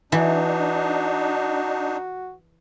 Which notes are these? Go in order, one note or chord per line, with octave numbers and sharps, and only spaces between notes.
E3 D4 D#4 F#4